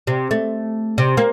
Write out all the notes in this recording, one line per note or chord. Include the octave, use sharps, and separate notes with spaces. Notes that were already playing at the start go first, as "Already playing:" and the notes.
C3
A3
C3
A#3